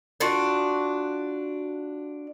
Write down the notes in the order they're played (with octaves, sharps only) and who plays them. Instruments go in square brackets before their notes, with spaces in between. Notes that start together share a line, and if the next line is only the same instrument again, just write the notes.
[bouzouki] D4 F4 F#4